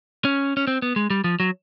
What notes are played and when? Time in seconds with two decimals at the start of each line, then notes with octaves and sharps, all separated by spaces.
0.25 C#4
0.57 C#4
0.67 C4
0.82 B3
0.96 G#3
1.10 G3
1.24 F3
1.40 F#3